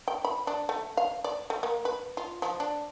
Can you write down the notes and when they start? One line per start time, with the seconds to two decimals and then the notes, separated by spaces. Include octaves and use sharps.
0.08 G5
0.25 B5
0.47 D4
0.69 A3
0.97 F5
1.24 D5
1.50 A3
1.63 A#3
1.85 B4
2.17 F4
2.42 F3
2.60 D4